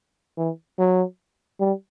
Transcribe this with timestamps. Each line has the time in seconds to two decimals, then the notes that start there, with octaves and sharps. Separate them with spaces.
0.38 E3
0.79 F#3
1.60 G3